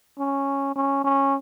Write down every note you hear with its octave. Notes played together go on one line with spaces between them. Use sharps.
C#4
C#4
C#4